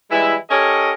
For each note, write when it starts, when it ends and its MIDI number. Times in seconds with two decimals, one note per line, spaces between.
0.11 0.35 52
0.11 0.35 55
0.11 0.35 56
0.11 0.35 64
0.50 0.92 61
0.50 0.92 67
0.50 0.92 69
0.50 0.92 70
0.50 0.92 73
0.50 0.92 75